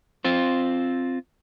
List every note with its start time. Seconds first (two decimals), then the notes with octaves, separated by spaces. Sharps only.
0.25 C4 F4 C5